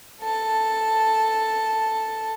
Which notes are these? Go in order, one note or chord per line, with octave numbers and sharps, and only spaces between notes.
A4 A5